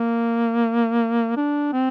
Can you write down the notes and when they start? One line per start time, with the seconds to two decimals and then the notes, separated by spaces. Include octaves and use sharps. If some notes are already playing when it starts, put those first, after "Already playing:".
Already playing: A#3
1.37 D4
1.73 C4